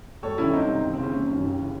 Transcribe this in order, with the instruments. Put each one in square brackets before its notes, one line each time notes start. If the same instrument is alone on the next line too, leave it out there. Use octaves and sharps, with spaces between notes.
[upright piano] E1 A4 C#5
D#2 D#3 C#4 E4
C2 C4 D#4
C3 E3
D#2
C4
C#3 E3 C#4
F#1 C#4
F#2 D#3
D#2
C#3 E3